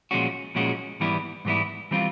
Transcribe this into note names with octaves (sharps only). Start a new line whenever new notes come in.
A#2 F3 G#3 C#4 F#4
A#2 F3 G#3 C#4 F#4
G#2 E3 G3 B3 E4
G#2 E3 G3 B3 E4
E3 G3 C4 F4